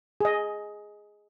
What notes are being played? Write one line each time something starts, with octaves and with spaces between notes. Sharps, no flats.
G#4 D#5